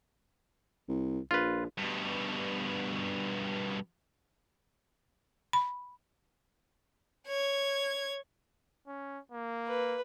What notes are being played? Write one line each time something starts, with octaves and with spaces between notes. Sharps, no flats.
C2
A#1 F4 B4
G2 B2
B5
C#5 G#6
C#4
A#3
B4